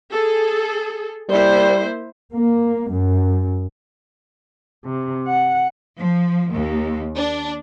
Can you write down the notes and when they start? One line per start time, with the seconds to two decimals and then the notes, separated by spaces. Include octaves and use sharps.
0.10 G#4 A4
1.30 G3 A#3 E4 C5
2.34 A#3
2.91 F#2
4.85 C3
5.27 F#5
5.99 F3
6.51 D#2
7.16 D4